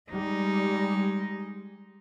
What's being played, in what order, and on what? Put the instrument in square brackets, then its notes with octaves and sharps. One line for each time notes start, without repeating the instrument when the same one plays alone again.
[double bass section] G3 [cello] G#3 D#4